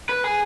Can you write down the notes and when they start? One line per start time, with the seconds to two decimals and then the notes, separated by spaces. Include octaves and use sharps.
0.09 B4
0.24 G#4